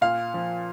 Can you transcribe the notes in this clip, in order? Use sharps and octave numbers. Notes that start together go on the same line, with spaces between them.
A#2 F5
F3